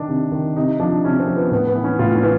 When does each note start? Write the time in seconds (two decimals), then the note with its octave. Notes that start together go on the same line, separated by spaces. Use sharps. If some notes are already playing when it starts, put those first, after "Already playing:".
Already playing: D#3 D4
0.08 C3
0.32 D#3
0.56 C3 D#4
0.80 F3 D4
1.04 C3 C#4
1.19 C4
1.28 F3
1.36 B3
1.51 A2 B3
1.67 B3
1.75 E3
1.84 C#4
1.99 A2 F4
2.15 C#4
2.23 E3